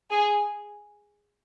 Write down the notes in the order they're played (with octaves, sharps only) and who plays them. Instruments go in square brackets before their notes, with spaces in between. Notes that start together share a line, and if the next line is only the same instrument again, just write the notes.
[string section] G#4